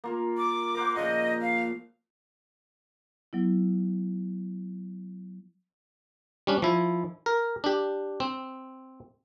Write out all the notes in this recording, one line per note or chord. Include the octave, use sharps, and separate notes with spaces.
A#3 F4 A#4
D6
A#4 C5 F#5
A#2 C#3 F3 D#5
F5
F#3 B3 E4
G3 C#4 D4
F3 E4
A#4
D4 G4
C4